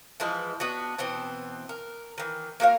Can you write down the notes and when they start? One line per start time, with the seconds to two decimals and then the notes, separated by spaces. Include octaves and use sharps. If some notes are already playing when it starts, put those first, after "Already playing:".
0.20 E3 F3 G#3 E4
0.60 B3 D4 F#4
0.98 B2 E3 B3 C4
1.69 A#4
2.18 D#3 E3
2.60 A#3 F#4 A#4 F5